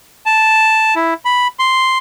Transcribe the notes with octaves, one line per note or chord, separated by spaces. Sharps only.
A5
E4
B5
C6